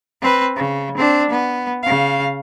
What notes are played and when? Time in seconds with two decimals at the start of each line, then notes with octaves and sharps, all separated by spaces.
0.21 C4 B4
0.56 C#3
0.97 C4 D4
1.30 B3
1.83 C#3 F5